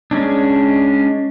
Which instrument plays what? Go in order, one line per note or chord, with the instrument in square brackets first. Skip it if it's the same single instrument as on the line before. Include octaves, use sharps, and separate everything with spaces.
[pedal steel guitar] G#3 C#4 D4